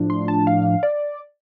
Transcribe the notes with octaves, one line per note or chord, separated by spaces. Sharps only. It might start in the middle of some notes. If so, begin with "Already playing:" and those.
Already playing: A2 F3 D4
C6
A5
F5
D5